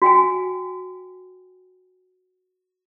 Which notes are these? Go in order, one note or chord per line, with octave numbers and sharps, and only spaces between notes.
F#4 G5 G#5